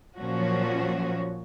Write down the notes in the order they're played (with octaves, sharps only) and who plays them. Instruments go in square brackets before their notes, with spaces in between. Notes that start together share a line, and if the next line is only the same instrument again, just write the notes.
[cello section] A#2 F3 F#3 C#4 F#4